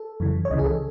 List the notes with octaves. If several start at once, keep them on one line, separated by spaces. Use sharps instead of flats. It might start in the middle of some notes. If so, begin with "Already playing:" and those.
Already playing: A4
F#2 C#3 E3
C#5
C#2 C#3 E3 D#5
G#4
A4